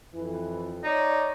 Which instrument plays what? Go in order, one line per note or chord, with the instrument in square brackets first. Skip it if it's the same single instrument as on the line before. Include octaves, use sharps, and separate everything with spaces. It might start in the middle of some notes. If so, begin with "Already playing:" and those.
[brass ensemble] F2 E3
[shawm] D#4 [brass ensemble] C#5 D5